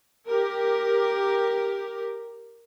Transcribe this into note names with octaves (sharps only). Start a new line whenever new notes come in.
G4 A#4